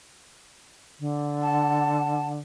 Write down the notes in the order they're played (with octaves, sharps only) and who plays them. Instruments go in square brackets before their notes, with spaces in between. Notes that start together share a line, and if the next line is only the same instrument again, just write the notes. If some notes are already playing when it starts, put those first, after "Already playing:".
[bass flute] D3
[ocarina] F#5 [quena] A5